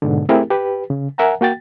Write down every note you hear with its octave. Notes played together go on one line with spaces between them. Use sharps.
G#2 B2 D3
A3 C4 E4 G4 G#4 A#4
G4 B4
C#3
A#4 E5 F#5 G#5 A#5
A#3 F#4 G5 A6